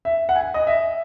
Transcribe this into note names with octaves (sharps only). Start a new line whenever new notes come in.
E5
F#5
G#5
D#5
E5